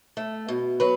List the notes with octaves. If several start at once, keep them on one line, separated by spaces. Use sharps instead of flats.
A3
B2
F#3 B4